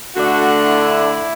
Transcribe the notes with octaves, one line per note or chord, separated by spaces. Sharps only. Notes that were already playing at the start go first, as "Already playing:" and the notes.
D3 A3 D4 F#4
E4